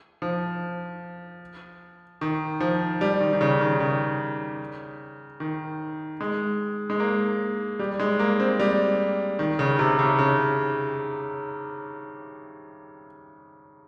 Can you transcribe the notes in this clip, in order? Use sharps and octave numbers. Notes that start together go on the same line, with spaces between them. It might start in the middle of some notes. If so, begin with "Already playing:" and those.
F3
D#3
F3
G3
D#3
D#3
C#3
D#3
C#3
D#3
G#3
G#3
A#3
G3
G#3
A#3
C4
G3
D#3
C#3
C3
C#3
C#3